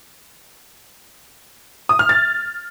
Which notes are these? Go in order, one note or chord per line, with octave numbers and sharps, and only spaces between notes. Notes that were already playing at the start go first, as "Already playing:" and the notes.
D#6
F6
A6